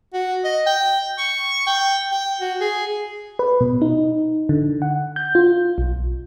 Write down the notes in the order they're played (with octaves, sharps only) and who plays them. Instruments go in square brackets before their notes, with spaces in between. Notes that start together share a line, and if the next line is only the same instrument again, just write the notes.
[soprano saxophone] F#4
D#5
G5
C#6
G5
G5
F#4
G#4
[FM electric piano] B4
B2
D#4
D3
F#5
G6
F4
B1